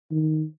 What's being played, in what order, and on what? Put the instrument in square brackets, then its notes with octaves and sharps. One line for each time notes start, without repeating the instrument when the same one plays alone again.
[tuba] D#3